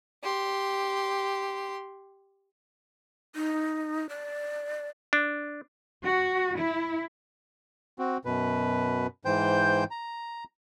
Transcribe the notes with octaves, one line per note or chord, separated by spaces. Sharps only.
G4 C6
D#4
D5
D4
F#4
E4
C4 F#4
F#2 B2 B4
G#2 E3 C5 G5 G6
A#5